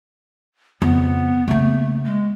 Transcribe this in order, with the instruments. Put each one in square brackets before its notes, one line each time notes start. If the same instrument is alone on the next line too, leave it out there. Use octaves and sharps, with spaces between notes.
[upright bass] F2 C#3 [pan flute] B3
[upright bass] C#3 A#3 [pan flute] A3
[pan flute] G#3